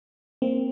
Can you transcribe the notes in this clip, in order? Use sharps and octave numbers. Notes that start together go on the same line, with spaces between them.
A#3 C4